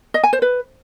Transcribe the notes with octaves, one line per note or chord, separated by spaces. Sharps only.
D#5
G#5
C5
B4